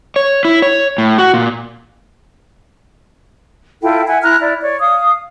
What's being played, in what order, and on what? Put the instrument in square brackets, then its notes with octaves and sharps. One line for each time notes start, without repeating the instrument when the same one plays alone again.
[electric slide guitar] C#5
E4
C#5
A2
F#4
A#2
[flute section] E4 F4 A4 G5
E5 F#5 G#5
E4 A#5 F6 F#6
E4 D5
C#5 D5
F5 D#6